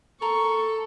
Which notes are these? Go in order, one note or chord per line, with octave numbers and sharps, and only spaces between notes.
A4 A#4 C#6